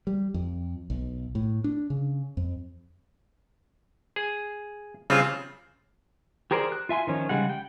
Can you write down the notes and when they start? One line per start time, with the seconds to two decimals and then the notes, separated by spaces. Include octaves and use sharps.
0.07 G3
0.34 F2
0.90 B1
1.35 A2
1.64 D4
1.90 C#3
2.37 F2
4.16 G#4
5.10 C#3 G3 C4 F4
6.51 G4 G#4 A#4 C5 D5
6.72 F#6
6.89 F4 E5 G#5 C6
7.07 D#3 F3 C#4
7.29 C#3 G3 G#3 F#5
7.49 G5